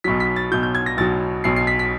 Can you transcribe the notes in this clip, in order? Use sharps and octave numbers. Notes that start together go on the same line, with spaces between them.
B1 B2 F#3 B6
B6
A6
B1 B2 F#3 G6
G6
G#6
A#6
B1 B2 F#3 A6
B1 B2 F#3 C7
C7
B6
B6